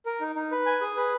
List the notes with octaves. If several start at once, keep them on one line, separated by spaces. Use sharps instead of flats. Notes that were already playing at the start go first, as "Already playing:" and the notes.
A#4
D#4
D#4
B4
G#5
G#4
B4